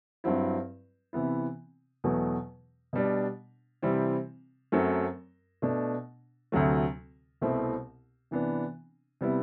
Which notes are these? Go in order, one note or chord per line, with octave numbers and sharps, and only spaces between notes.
G2 F#3 C4 E4
C3 E3 B3 E4
E2 B2 F#3 A3
B2 G3 D4
C3 E3 G3 C4 E4
F#2 F#3 A3 C4
B2 A3 D4
D2 C3 F#3 A3
C2 B2 A3 C4 E4
C3 E3 B3 D4
C3 G3 B3 E4